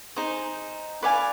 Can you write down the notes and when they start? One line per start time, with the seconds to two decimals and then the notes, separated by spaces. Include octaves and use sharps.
0.16 D#4 G#4 C5
1.03 B4 D5 F5 G#5